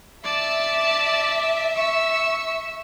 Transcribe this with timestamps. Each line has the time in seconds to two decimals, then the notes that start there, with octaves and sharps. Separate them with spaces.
0.24 D5 E5 A5
1.75 C#6 E6